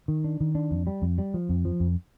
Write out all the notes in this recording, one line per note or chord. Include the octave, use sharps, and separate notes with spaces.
D#3
D4
D#3
D4
F2
G3
F2
G3
F3
F2
F3
F2